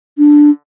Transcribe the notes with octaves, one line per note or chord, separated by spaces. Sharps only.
D4